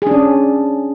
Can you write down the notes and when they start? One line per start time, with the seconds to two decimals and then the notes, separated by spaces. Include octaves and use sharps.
0.02 G#4
0.07 D4
0.11 C#4